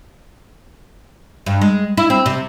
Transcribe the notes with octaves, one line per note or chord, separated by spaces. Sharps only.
G2
G#3
E4
C4
C3